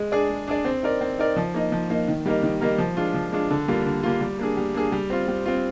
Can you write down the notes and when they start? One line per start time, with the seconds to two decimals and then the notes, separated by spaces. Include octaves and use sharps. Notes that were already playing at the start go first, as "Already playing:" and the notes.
Already playing: G#3
0.12 D4 G#4 D5
0.30 G#3
0.48 D4 G#4 D5
0.65 C4
0.83 D#4 A#4 D5
1.01 C4
1.19 D#4 A#4 D5
1.36 F3
1.54 A#3 D#4
1.72 F3
1.90 A#3 D#4
2.08 D#3
2.26 G3 A#3 D#4 A#4
2.43 D#3
2.61 G3 A#3 D#4 A#4
2.78 F3
2.97 G#3 D4 F4
3.14 F3
3.32 G#3 D4 F4
3.50 D3
3.68 G3 A#3 F4
3.86 D3
4.03 G3 A#3 F4
4.21 G3
4.39 A#3 D4 G#4
4.57 G3
4.74 A#3 D4 G#4
4.92 G3
5.10 C4 F4
5.28 G3
5.46 C4 F4